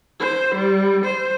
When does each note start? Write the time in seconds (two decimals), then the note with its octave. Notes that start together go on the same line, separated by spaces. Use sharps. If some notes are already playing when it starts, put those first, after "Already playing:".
0.20 C5
0.55 G3
1.05 C5